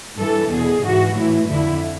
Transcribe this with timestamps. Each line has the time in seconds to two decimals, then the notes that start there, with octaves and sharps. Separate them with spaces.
0.19 G2 E3 A4
0.52 E2 B2 G#4
0.83 G#2 E3 F#4
1.15 A2 E3 E4
1.47 F2 D3 E4